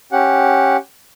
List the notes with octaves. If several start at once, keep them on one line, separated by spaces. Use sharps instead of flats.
C#4 G4 F#5